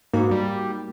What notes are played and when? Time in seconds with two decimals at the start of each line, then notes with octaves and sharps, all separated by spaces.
0.14 G#2 A#3 D#4 F#4 B5
0.31 G3